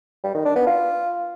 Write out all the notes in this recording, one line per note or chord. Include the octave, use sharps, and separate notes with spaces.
G3
D#3
D4
B3
F4